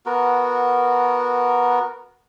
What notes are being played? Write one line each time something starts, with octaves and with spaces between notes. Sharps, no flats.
B3 F#4 A#4